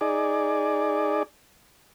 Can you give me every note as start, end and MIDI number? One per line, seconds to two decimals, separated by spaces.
0.01 1.23 63
0.01 1.23 68
0.01 1.23 74